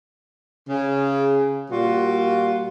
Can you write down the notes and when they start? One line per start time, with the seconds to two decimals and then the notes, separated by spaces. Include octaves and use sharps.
0.69 C#3
1.71 A#2 G3 F4 F#4